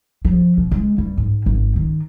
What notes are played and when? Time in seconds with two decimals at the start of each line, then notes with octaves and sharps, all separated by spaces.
0.25 F3
0.57 B2
0.71 G#3
0.98 G2
1.18 G#2
1.46 G#1
1.76 D#3